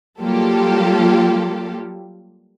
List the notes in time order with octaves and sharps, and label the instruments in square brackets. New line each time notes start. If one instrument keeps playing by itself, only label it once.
[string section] F#3 G3 A#3 F4 G4 A4